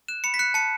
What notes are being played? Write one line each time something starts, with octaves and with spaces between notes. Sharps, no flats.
F#6 E7
B5 C#7
B6
F#6 C#7
A5 C#7